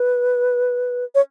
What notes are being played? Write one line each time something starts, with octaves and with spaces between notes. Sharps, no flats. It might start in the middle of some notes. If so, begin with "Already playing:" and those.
Already playing: B4
C#5